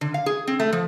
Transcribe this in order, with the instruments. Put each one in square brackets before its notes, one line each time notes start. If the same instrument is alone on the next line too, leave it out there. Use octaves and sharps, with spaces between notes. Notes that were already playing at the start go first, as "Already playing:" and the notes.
[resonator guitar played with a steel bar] D3
F5
G#4
C4
A3
F3